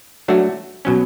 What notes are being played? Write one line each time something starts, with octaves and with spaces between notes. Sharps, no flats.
F#3 A3 D4 F#4
B2 F#3 C#4